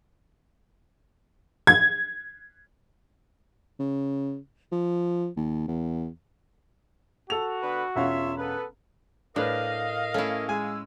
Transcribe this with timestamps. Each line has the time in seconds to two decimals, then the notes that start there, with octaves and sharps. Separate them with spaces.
1.67 G#6
3.80 C#3
4.72 F3
5.37 D#2
5.68 E2
7.30 F#4 A4 F7
7.62 D3 B3 B4
7.95 E1 C#4 F4 C#5 E5 F5
8.38 B3 A4 B4
9.36 A2 D4 A#4 B4 D#5 F5
10.14 A3 C#4 E4
10.48 G#3 G#4 G#5 E6